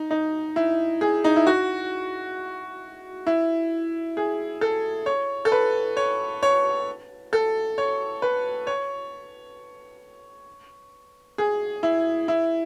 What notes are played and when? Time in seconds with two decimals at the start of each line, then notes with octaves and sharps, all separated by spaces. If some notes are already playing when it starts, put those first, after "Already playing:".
Already playing: D#4
0.11 D#4
0.56 E4
1.01 G#4
1.24 D#4
1.36 E4
1.47 F#4
3.27 E4
4.17 G#4
4.61 A4
5.06 C#5
5.45 A4
5.52 B4
5.97 C#5
6.43 C#5
7.33 A4
7.78 C#5
8.22 B4
8.67 C#5
11.38 G#4
11.83 E4
12.28 E4